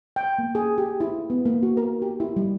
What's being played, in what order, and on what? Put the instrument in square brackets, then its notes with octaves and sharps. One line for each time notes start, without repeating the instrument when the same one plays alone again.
[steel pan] G5
A#3
G#4
G4
E4
B3
A#3
F#4
A#4
G4
E4
G3